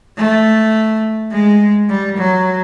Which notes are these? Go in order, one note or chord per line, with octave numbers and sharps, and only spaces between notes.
A3
G#3
G3
F#3